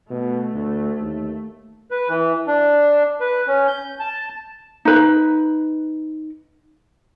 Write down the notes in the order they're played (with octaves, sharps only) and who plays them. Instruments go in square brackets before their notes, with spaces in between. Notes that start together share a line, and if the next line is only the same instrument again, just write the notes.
[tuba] B2 [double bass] A3
[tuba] D2
D#2
[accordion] B4
E3
D4
B4
C#4
G6
A5
[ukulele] D#4 B4